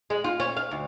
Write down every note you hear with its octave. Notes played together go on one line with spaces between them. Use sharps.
G#3
F4
C#4
F5
D2